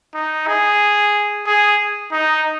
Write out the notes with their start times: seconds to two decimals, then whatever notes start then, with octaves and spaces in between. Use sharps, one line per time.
0.15 D#4
0.47 G#4
1.46 G#4
2.12 D#4